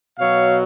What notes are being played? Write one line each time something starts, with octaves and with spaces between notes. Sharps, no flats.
B2 F#3 C#5 F5